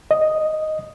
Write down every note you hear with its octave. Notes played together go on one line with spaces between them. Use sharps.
D#5